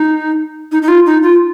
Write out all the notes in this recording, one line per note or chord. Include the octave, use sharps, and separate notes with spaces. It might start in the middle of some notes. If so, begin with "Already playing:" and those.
Already playing: D#4
D#4
D#4
F4
D#4
F4